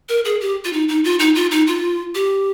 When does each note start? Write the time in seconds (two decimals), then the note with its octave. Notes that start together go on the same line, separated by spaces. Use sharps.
0.09 A#4
0.25 G#4
0.41 G4
0.64 F4
0.73 D#4
0.89 D#4
1.04 F4
1.19 D#4
1.35 F4
1.51 D#4
1.67 F4
2.15 G4